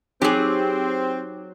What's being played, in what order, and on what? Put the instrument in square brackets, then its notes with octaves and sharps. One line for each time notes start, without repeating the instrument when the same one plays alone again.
[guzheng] F#3 [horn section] C4 [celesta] D#4 D6 [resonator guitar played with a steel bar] G4 G#4